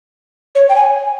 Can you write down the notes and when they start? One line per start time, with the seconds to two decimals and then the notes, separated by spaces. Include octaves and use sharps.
0.55 C#5
0.69 G5
0.76 G#5